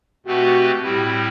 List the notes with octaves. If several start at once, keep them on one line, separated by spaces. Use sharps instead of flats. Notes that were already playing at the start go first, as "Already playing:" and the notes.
B2 A3 C4 F#4 G4 B4
A2 G3 C4 E4 G4